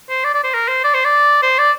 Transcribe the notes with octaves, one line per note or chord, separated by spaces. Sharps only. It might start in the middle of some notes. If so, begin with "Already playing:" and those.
C5
D5
D5
C5
A#4
C5
D5
C5
D5
C5
D5